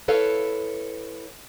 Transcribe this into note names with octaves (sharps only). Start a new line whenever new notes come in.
E4 A4 B4 C#5 F5